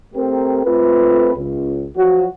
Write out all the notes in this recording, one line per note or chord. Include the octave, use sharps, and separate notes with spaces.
A3 C4 G4 A#4
A3 C4 F4 A4 B4
C#2
F3 F#3 F#4